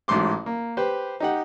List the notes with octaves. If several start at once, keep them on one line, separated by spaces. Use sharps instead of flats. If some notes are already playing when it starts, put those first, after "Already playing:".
A1 G#2 F#3 A3 C6 D6
A#3
G4 B4 C5
D#4 G4 F#5